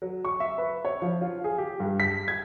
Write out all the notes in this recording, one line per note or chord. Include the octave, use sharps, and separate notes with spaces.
F#3
C#6
E5
B4
C#5
F3
F4
G#4
G4
G2
B6
G#6